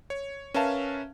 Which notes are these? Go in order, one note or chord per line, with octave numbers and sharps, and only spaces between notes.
C#5
C#4 A#4 B4 E5 F5 A5